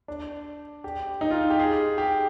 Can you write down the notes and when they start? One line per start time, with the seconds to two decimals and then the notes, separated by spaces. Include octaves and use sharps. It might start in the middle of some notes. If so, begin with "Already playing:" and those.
0.08 D4
0.84 G4
1.21 D#4
1.31 F4
1.50 G4
1.60 G#4
1.98 G4